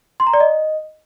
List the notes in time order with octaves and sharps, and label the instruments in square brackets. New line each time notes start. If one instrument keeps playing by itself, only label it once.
[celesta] C6
A#5
D5
D#5